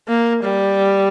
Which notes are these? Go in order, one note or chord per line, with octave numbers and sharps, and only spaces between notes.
A#3
G3